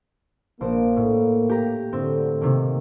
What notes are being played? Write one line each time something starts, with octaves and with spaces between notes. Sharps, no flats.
A#1 A#3 C5 D7
A2
G4 A#5
A2 D3 C4
C3 D#3 A#3